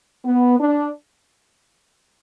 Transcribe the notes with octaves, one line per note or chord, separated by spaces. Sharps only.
B3
D4